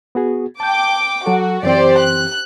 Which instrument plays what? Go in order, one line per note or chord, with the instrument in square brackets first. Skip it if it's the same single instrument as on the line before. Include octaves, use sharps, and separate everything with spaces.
[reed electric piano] B3 F#4 G#4
[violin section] G5 D6 [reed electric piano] A5 G6
[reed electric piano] F#3 A4 [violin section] F#4
[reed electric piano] F#2 E3 C4 [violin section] G4 C5 D5
[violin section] F#6